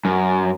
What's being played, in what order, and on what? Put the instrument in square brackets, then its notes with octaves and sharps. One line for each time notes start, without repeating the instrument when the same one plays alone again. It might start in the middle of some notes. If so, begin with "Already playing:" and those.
[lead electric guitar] F#2